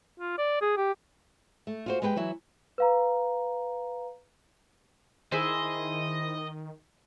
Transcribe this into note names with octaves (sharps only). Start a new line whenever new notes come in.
F4
D5
G#4
G4
A3
F4 F#4 C5
G#3 G4 B4 C5 G5
E3 F#3 E4
B4 F5 A#5
D#3 E4 G#4 C5 D#5